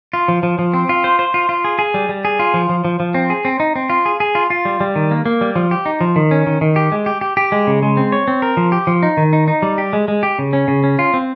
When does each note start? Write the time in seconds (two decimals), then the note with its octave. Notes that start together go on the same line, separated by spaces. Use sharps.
0.13 F4
0.28 F3
0.43 F3
0.59 F3
0.74 C4
0.89 F4
1.04 C5
1.19 C5
1.34 F4
1.49 F4
1.64 G#4
1.79 G#4
1.94 G3
2.09 G3
2.25 G#4
2.39 F4
2.54 F3
2.69 F3
2.85 F3
3.00 F3
3.14 C4
3.30 G#4
3.45 C4
3.60 D#4
3.76 C4
3.90 F4
4.06 G#4
4.20 G#4
4.35 F4
4.50 F4
4.65 G3
4.80 G3
4.96 D#3
5.11 A#3
5.26 A#3
5.41 G3
5.56 F3
5.71 G4
5.86 D#4
6.01 F3
6.16 D#3
6.31 C#4
6.47 D#3
6.61 D#3
6.76 G4
6.92 G#3
7.06 G4
7.21 G4
7.37 G4
7.52 G#3
7.67 C#3
7.83 G#3
7.97 C4
8.12 C#5
8.28 C4
8.42 A#4
8.57 F3
8.72 G4
8.87 F3
9.03 D#4
9.17 D#3
9.33 D#4
9.48 D#4
9.62 G3
9.78 G4
9.93 G#3
10.08 G#3
10.23 G4
10.39 C#3
10.53 C#4
10.68 C#3
10.84 C#4
10.99 F4
11.14 C4